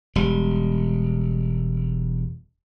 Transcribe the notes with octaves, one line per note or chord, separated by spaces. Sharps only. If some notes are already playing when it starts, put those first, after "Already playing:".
E1 G3